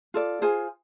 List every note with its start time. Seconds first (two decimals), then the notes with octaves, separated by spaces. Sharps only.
0.14 F4 A4 D5
0.42 F4 G#4 C5 G#5